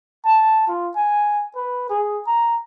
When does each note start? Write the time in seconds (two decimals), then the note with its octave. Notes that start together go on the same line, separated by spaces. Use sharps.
0.25 A5
0.68 F4
0.96 G#5
1.55 B4
1.90 G#4
2.27 A#5